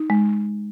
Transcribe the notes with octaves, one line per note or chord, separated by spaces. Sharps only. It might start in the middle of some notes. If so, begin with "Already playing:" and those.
Already playing: D#4
G#3